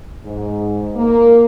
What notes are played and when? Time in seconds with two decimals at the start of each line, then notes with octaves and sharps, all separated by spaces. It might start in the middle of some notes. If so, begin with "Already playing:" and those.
0.25 G#2
0.96 A#3